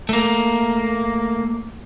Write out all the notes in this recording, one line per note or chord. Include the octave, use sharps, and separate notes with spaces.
A3 A#3